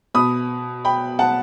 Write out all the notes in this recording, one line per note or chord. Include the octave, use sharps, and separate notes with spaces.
B2 B5 D#6
G5 B5
F#5 A5